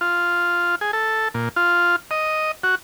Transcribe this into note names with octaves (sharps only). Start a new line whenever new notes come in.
F4
G#4
A4
A#2
F4
D#5
F#4